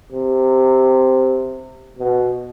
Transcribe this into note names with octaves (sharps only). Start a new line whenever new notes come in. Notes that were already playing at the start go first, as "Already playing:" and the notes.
C3
B2